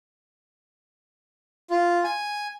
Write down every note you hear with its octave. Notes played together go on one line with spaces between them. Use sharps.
F4
G#5